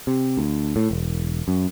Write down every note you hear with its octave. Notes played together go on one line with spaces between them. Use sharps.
C3
D2
A2
E1
F#2